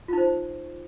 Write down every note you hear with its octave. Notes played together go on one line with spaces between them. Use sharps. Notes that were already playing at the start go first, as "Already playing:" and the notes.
D#4 F4 C5